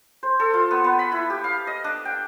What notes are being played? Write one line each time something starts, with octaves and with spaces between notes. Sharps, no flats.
C5
A4
F4
B3
B3
B5
E4
G4
F5
D#5
D4
G5